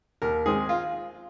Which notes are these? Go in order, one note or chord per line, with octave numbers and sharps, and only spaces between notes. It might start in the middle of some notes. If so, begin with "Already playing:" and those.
D#2 A#4
D#3 G#3 C4 G#4
F4